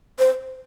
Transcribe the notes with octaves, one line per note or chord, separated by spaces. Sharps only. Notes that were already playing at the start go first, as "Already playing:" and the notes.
C5